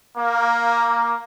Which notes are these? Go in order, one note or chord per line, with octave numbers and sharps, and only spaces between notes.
A#3